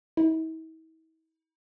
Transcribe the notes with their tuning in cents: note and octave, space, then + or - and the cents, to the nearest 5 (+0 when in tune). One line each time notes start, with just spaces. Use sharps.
E4 -45